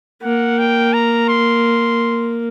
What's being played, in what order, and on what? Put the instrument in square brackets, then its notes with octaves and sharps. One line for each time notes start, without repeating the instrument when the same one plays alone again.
[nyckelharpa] A#3 [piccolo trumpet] F#5
[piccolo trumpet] G5
A#5
C6